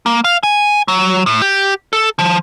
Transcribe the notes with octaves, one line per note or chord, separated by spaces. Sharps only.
A#3
F5
G#5
F#3
A2
G4
A4
F3